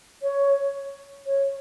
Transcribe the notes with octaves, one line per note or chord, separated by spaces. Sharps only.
C#5
C#5